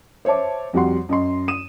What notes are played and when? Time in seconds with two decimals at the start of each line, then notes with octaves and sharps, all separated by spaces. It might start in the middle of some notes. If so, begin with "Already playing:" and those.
0.25 C5 C#5 E5 A5 D6
0.73 F2 G3 F#4 F#5 C6
1.09 F#2 D#5 C6
1.48 D#6 D#7 E7